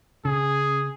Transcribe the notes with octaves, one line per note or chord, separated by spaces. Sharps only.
C#3 G#4